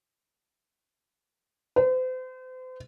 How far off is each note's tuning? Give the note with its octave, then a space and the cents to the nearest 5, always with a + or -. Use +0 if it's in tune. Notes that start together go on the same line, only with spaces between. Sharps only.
C5 -40